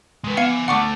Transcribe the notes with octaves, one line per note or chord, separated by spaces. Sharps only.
G#3 B4
B3 E5 F5 G#5 C#7
D3 A3 F#5 C#6 D6